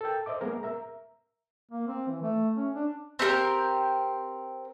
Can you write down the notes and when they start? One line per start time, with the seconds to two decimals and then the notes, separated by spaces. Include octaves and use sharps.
0.01 A4 A#4 G5
0.26 C5 D#5 E5 D6
0.41 G#3 A#3 B3 G#4 A#4
0.63 A#4 E5 A#5
1.72 A#3
1.88 C4
2.08 E3
2.22 A3
2.56 C#4
2.75 D4
3.19 C4 G4 A4 A#4